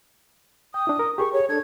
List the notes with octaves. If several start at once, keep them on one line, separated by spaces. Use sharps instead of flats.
G5 D#6
D4 E4
A#4
G4 G#4 A#4 C#6
C#5
D4 A4 G#6